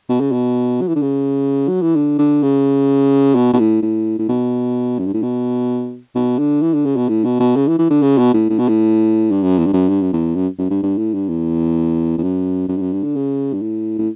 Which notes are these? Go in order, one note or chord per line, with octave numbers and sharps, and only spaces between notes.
B2
C#3
B2
F#3
E3
D3
C#3
F#3
E3
D3
D3
C#3
B2
B2
A2
A2
A2
B2
F#2
G2
A2
B2
B2
D3
E3
D3
C#3
B2
A2
B2
B2
C#3
E3
E3
D3
C#3
B2
A2
A2
B2
A2
G2
F#2
E2
G2
F#2
G2
F#2
E2
F#2
F#2
G2
G2
A2
G2
E2
E2
F#2
F#2
G2
F#2
G2
D3
C#3
G2
A2
A2